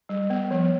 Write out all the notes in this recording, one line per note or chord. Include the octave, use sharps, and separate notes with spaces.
G3
B3
F3